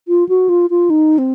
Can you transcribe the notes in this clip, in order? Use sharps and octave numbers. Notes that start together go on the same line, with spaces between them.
F4
F#4
F4
F4
D#4
C4